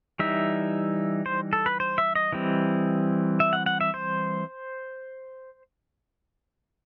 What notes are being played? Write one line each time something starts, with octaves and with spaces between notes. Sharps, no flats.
E3 G3 D#4 E5
C5
A4
B4
C5
E5
D#5
E3 G3 C4
E5
F#5
F#5
E5
C5